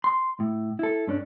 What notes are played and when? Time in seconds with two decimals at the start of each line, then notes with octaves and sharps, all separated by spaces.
0.04 C6
0.40 A2
0.79 E4 A4
1.07 G2 C#4 D4